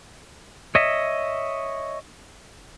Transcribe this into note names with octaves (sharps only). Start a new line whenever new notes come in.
C#5 D#5 E5